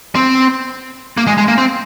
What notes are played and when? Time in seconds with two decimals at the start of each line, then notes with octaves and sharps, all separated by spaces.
0.15 C4
1.17 A#3
1.27 G#3
1.38 G#3
1.48 A#3
1.58 C4